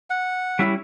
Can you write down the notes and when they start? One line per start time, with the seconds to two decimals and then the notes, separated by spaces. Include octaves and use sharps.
0.10 F#5
0.59 G3 C#4 E4